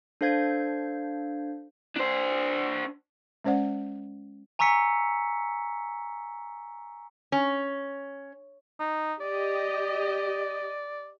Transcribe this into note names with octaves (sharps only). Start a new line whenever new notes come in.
D4 A4 C5 F5 G6 G#6
D4 C5
G#3 C#4 C5 D5 F#5
G#5 A#5 C#6 E6 B6 C#7
C#4
D#4
G4 D5 D#5